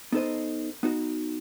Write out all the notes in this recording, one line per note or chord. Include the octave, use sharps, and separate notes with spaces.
B3 D#4 A4 C5 D#5
B3 D#4 F#4